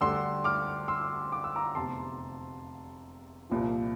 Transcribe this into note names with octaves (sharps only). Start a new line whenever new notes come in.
D2 D3 G3 C6 E6
D6 F6
C6 E6
D6
E6
A#5 D6
F1 E2 C3 A5 C6
C2 A#2 F3